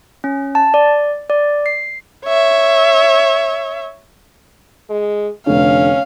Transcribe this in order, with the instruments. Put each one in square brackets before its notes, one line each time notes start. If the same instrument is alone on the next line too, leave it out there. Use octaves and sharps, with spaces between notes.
[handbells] C#4
A5
D5
D5
C7
[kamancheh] C#5 E5
[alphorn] G#3
[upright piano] F1 D3 [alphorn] C#4 [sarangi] F5